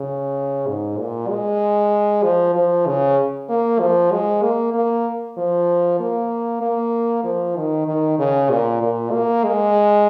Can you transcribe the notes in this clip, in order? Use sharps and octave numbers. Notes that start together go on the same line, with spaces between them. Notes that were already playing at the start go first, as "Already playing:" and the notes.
Already playing: C#3
G#2
A#2
G#3
F3
F3
C#3
A#3
F3
G#3
A#3
A#3
F3
A#3
A#3
F3
D#3
D#3
C#3
A#2
A#2
A#3
G#3